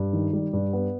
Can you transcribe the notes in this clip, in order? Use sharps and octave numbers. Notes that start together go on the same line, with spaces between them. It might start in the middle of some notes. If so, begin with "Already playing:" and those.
Already playing: G2
D#3
G3
G2
B3